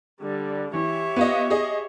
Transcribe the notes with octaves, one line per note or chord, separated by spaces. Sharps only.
D3 G3
E3 G4 C#5 E5
B3 F4 D#5
G#4 D#5